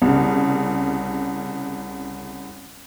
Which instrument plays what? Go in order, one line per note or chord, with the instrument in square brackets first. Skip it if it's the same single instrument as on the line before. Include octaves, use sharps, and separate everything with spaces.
[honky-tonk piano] C2 C#3